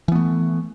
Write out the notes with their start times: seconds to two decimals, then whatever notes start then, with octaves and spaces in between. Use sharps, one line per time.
0.08 E3
0.12 B3
0.15 A3